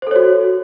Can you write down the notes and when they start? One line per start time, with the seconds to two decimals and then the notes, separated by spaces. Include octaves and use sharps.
0.02 C5
0.07 A4
0.11 C#5
0.16 F#4